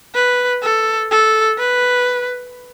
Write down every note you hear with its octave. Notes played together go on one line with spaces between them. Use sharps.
B4
A4
A4
B4